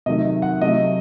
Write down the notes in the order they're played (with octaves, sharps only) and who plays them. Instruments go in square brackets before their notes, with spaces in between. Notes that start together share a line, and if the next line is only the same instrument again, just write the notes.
[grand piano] C3 D#3 F#3 A3 D#5
F#5
C3 F#3 A3 D#5